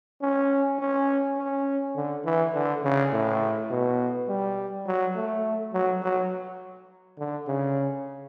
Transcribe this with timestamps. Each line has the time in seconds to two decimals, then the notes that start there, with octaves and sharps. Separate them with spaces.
0.22 C#4
0.79 C#4
1.38 C#4
1.96 D3
2.25 E3
2.54 D3
2.83 C#3
3.12 A2
3.70 B2
4.28 G3
4.86 F#3
5.15 A3
5.73 F#3
6.02 F#3
7.19 D3
7.47 C#3